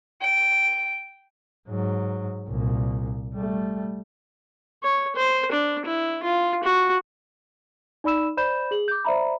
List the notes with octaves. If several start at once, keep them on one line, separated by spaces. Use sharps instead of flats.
G5
G#2 F#3
C2 A#2
G3 A3
C#5
C5
D4
E4
F4
F#4
D#4 D5 B5 E6 E7
C5 D5 B5 G6 E7
G#4 F#7
D6 G6
C5 D5 E5 A#5 B5